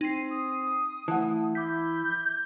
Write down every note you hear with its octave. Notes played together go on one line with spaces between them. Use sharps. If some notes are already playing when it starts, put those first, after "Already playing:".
C4 D#4 C7
D#6
E3 A3 F#5 A5
E4 D6 G6 B6